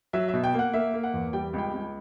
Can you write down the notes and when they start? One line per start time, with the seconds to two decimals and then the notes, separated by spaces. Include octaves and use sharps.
0.13 F#3 E5
0.28 B2 E5
0.44 G5
0.54 A#3
0.59 F#5
0.74 A#3 E5
0.94 A#3
1.03 F#5
1.14 E2
1.33 G3 G5
1.53 C#2 G5
1.73 C#2